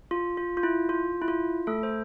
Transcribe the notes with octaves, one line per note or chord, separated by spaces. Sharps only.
F4
F4
F4
E4
F4
E4
F4
A3 A4
C5